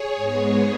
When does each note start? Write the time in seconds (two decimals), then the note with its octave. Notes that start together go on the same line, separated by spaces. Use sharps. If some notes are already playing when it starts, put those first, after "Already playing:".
Already playing: G#4 C#5
0.15 G#2 G#3 B3